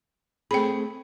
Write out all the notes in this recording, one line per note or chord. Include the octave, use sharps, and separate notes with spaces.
A3 C4 G#4 G5 B5